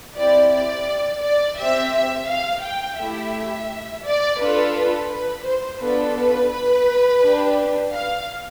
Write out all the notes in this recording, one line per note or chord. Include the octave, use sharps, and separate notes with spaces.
C4 E4 G4 D5
D5
D5
C4 G4 E5
E5
F5
G5
A3 E4 G4 E5
D5
D4 F4 A4 B4
B4
B4
C5
B3 D4 F4 A4 B4
B4
B4
D4 G4
F5